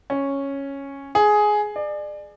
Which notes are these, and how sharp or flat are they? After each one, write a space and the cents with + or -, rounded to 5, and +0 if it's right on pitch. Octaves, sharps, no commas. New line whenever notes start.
C#4 -5
G#4 +10
D5 +30